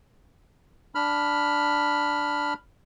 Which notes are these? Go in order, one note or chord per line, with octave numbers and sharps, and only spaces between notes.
D4 B5 F6